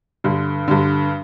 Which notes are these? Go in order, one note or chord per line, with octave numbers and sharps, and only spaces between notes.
G2 D3
G2 D3